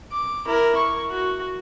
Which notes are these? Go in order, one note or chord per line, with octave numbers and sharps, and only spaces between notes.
D6
E4 A#4
C#6
F#4